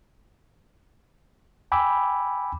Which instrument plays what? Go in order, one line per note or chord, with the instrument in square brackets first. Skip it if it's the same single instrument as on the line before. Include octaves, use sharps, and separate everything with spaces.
[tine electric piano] G5 G#5 B5 D6 E6